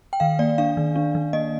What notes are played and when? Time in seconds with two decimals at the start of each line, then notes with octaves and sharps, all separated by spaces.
0.13 G5
0.20 D#3 F5
0.39 A#3 D5
0.58 D4 F5
0.77 D#3
0.96 D4
1.15 D#3
1.33 A#3 D#5